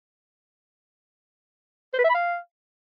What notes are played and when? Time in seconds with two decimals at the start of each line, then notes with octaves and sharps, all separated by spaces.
1.94 C5
1.99 B4
2.04 E5
2.09 B5
2.15 F5